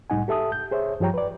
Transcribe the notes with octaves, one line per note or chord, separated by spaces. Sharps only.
C2 A2 G3 D#4 F#5 G#5
G4 A4 E5 A5 D#6
G6
G#4 C5 C#5 E5
G2 F3 G4 C#5 G5 A#5
B4 D5